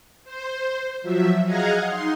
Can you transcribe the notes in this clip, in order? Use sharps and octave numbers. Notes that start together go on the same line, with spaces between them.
C5
F3 F#3 E5
G#4 D#5 F5 F#5 G#5 A#5
D#4 C6